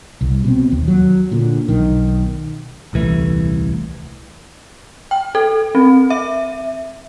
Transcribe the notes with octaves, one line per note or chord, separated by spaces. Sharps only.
C2
B2 C4
D#2
F#3
A#2 D3
B1 D#3
D#1 C2 E3 A3
G5
A4
C4
E5